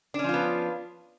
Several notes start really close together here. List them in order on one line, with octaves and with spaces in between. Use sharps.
D4 C#4 F3 F4 B3